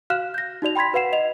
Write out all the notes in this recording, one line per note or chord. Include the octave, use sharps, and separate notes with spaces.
F#4 F5 F6 F#6 E7
G6 A#6
D#4 F#4 D5 F7
G5 B5 C6 G#6 B6
F#4 B4 F5 F#5 C7 E7
D#5 F7